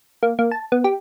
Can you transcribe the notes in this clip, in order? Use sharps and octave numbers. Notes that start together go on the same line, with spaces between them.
A#3
A#3
A5
B3
G4